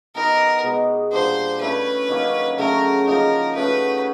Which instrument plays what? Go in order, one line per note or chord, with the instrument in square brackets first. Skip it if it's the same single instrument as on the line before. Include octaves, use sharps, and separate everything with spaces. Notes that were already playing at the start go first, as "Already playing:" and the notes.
[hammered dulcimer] B3 D#4 G4 B4 [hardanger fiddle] A#4
[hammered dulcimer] B2 G#3 B3
[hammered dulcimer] A#2 G3 A#3 D4 [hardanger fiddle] C5
[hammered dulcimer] A3 C#4 E4 [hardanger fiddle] B4
[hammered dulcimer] D#3 F#3 A#3 C#4
[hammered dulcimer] C#3 F#3 A3 [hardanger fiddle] A#4
[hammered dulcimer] C#3 F3 A#3 D#4 [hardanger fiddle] A#4
[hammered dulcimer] A3 C#4 F#4 [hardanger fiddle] B4